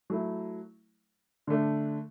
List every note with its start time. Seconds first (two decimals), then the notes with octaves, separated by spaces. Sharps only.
0.10 F#3 A3 E4
1.47 D3 A3 D4